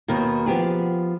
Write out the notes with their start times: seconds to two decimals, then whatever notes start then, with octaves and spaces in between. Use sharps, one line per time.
0.08 D#2 B2 A#4
0.46 F3 B3 G4 G#4